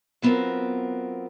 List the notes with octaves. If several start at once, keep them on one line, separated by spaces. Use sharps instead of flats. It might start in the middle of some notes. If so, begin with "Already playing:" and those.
F#3 B3 C4 F4 A#4